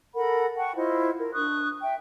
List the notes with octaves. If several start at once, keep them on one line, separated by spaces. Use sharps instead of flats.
A4 A#4 F#5 B5
F#5 G5 A5 C#6
E4 F4 C5 D#5
A#4
D4 C#6 D#6 F#6
E5 G5